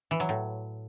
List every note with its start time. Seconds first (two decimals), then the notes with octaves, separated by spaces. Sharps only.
0.11 E3
0.20 F#3
0.29 A2